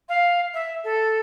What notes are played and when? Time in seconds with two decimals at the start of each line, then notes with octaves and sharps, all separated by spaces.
0.08 F5
0.53 E5
0.83 A4